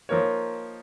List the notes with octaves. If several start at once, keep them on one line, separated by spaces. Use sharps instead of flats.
F3 A#3 D#4 A#4 C#5